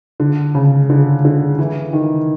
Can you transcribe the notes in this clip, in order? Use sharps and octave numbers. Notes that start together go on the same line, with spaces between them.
D3
C#3
D3
D3
E3
D#3